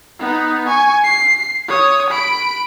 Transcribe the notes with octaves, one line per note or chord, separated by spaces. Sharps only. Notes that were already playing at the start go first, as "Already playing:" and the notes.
B3 D#4
G#5 C#6
C7
C#5 D#6
B5 D7